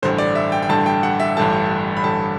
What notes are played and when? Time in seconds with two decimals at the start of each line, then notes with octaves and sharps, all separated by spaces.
0.02 A1 G2 D3 C5
0.18 D5
0.35 E5
0.52 G5
0.63 G5
0.69 A1 G2 D3 A5
0.86 G5
1.03 F#5
1.20 E5
1.37 A1 G2 D3 A5
1.97 B5
2.04 A1 G2 D3 A5